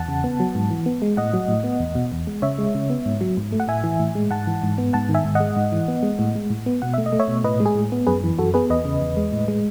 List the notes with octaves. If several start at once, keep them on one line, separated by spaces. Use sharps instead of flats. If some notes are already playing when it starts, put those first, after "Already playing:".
Already playing: E2 F#5 A5
C#3
B3
F#3
G#2
E3
B3
G#3
A2 D#5 F#5
F#3
A2
B3
E2
B2
E2
G#3
C#3 C#5 E5
G#3
C#3
B3
G#2
F#3
G#2
A3
F#5
A2 E5 G#5
E3
A2
G#3
G#2 F#5 A5
E3
G#2
B3
G#2 F#5 A5
D#3
E5 G#5
G#2
D#5 F#5
G#3
G#2
E3
B3
G#3
A2
G#3
A2
B3
B2 F#5
A3 E5
D#5
A3
C#5 E5
B2
A2 B4 D#5
G#3
G#4
A2
B3
F#2 G#4 B4
E3
F#2 F#4 A4
B3 G#4 B4
E2 B4 D#5
C#3
E2
G#3
A2
G#3